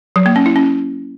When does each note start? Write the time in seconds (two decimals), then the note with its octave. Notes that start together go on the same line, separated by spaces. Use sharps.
0.16 F#3
0.26 A#3
0.36 C#4
0.46 E4
0.56 C#4